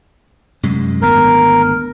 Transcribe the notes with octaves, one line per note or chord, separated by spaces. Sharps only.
F#2 C3 G#3
G#1 D2 B3 A#4